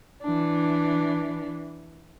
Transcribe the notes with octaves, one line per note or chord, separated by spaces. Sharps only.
E3 D4